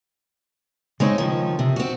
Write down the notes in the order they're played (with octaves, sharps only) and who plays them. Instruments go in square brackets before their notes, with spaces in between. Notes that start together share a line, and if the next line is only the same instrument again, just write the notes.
[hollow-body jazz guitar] C#3 C#5 [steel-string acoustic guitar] G#3 C4 D#4
[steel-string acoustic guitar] D#3 F3
C3
C4 F#4